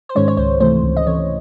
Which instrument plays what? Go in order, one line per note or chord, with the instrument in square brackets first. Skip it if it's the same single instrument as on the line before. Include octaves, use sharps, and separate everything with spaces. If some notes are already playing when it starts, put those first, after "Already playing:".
[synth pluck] C5
G#2 D#3 G#3 C#4 C#5
C#5
C#2 C5
C3 E3 A3 C5
C#2
D#5
C3 E3 A3 C#5